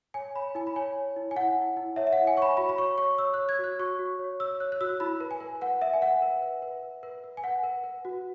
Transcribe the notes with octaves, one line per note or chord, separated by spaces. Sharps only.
C#5 G#5
C#5 B5
E4 G#5
B5
C#5 G#5
C#5
E4
G#5
E4 F#5
E4
E4
C#5 E5
E5
E4 F#5
G#5
C#5 C#6
B5
F#4 B5
B5
C#5 C#6
C#5 C#6
C#5 E6
C#5 F#6
G#6
F#4 F#6
F#4 C#6
F#4
C#5
C#5 E6
C#5 F#6
F#6
F#4 E6
E4 B5
B4
G#5
B4
B4 F#5
B4 E5
G#5
B4 F#5
B4
B4
B4
B4
B4
B4
G#5
B4 F#5
B4
B4
F#4